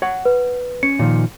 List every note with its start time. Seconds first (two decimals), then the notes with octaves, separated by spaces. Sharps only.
0.02 C#5 F#5
0.25 B4
0.83 C#4 C#7
0.99 A#2 D#3 F3